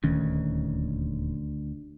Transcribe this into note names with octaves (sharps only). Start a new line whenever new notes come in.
D#1 D2 D#3 C#4